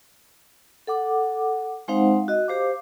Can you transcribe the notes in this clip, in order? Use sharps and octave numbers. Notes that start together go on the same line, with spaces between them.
A4 F#5 D6
G#3 C4 D#4 C5 F5 F#5
F#4 D#5
G4 C5 F5 D6